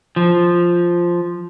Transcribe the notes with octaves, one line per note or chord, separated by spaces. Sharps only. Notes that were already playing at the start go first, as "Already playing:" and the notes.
F3